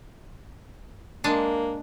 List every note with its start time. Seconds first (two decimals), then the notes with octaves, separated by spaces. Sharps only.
1.24 G#3 A#3 D4